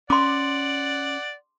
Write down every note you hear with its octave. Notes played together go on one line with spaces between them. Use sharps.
C#4 D5 F#5 C6 D6